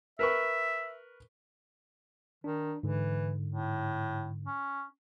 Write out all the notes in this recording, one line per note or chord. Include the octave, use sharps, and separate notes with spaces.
A#4 B4 E5 C#6
D#3 D4
G#2 D3 E3
A2
C#4